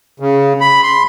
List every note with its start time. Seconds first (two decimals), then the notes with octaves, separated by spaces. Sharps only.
0.20 C#3
0.61 B5
0.83 C6